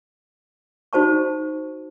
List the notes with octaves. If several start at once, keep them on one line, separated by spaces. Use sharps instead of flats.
D#4 F#4 C5 A5 C#6